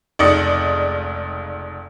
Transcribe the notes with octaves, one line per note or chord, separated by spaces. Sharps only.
F1 C#2 D#4 D5 D#5 C#7